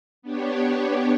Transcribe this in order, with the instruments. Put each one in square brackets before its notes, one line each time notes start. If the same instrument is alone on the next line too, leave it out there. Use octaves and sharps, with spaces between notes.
[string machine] B3 D4 G4 C#5